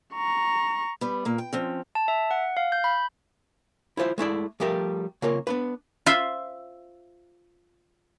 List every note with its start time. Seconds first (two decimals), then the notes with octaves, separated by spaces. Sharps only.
0.15 A#5 C#6
1.01 G3 B3
1.25 A#2 A#3
1.38 G5
1.53 F3 C4 C#4
1.95 A5
2.08 E5
2.31 F#5
2.57 F5
2.72 G6
2.84 B5
3.97 E4 F4 C5 E5
4.18 G#3 A3 E4 D5
4.60 F3 G3 A3 G4 A#4 E5
5.22 C#3 A#3 F4 A#4 C#5
5.47 B3 D4 B4
6.06 F4 C5 E5